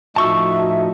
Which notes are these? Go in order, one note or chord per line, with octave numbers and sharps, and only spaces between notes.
A2 F3 D#4 F#4 E5 A5 C#6 E6